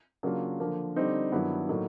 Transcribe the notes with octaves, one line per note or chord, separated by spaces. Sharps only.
C#3 F#3 A#3 D4 F4
D3 F3 A#3
D3 G3 C4 D#4
G2 D#3 F#3 B3 E4
A2 F#3 A#3 D#4